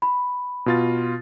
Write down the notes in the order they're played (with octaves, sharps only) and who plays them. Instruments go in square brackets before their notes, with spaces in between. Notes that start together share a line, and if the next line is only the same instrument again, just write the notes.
[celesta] B5
[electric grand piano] B2 F4 A6